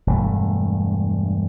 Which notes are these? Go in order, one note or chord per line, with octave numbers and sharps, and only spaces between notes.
E1 G2 A3